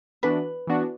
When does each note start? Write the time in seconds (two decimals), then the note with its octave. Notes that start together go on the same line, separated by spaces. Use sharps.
0.23 E3 B3 D4 F#4 B4
0.67 E3 B3 D4 F#4